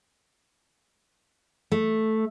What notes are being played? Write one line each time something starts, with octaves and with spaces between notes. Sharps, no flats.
A3